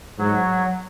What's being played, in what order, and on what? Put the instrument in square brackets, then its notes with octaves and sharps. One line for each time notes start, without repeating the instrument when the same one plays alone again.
[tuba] G#2 [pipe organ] F#3